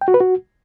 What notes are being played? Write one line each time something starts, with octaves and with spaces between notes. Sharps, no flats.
G5
F#4
B4
F#4